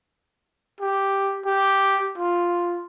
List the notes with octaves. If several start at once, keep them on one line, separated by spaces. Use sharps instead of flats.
G4
G4
F4